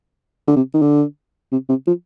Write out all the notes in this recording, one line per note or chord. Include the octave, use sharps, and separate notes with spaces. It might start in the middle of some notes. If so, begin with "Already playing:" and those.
D3
C3
D#3
D3
C3
C3
F3